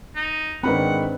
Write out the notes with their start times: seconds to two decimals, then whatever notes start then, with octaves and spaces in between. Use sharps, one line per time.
0.16 D#4
0.63 G#2 D#3 C4 D4 B4 F#5 B5